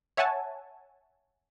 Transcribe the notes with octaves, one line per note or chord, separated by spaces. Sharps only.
C#5 E5 F#5 G#5 A5